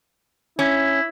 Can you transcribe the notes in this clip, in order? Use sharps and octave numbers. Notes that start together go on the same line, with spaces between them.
C#4 E4